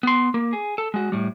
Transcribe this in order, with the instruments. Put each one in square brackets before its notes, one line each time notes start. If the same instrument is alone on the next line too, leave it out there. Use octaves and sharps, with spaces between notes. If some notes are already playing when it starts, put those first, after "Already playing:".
[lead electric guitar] B3 C6
A#3
G#4
A4
G#3 F#4
A2 G3